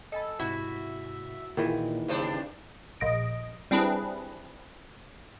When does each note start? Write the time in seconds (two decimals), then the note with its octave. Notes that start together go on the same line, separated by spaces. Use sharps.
0.12 A4 D#5 G#5 B5
0.39 G#2 C3 E4 F#4 E5
1.57 A#2 D#3 E3 A#3 F4 G#4
2.08 G2 C#3 D4 C5
3.00 A#1 D#5 D7
3.71 G3 C4 D4 E4 G#4 B4